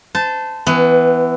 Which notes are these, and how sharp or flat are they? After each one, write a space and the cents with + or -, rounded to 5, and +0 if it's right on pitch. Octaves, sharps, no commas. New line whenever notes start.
C5 -30 A5 +0
E3 +0 B3 +25